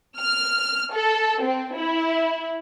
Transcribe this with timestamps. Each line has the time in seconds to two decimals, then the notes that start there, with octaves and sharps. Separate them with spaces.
0.19 F6
0.93 A4
1.42 C4
1.76 E4